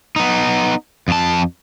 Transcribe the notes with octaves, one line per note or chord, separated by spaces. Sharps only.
B3 D#4
F2 A5